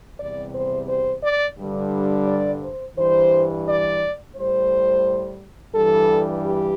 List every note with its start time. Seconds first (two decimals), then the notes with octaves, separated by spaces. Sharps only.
0.19 E2 C3 G3 D5
0.54 C5
0.88 C5
1.23 D5
1.58 G2 D3 G3
2.27 D5
2.62 C5
2.96 G2 E3 G3 C5
3.66 D5
4.35 A2 G3 C5
5.74 G2 E3 G3 A4
6.43 G4